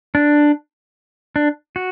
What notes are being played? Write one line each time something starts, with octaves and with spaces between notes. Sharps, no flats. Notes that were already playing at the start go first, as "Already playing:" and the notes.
D4
D4
F#4